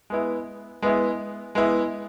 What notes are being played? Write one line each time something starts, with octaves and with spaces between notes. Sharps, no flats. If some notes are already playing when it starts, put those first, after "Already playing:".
G#3 B3 E4
G#3 B3 E4
G#3 B3 E4